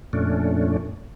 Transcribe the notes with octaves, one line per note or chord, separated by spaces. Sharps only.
F2 A#2 A3 C#4 D4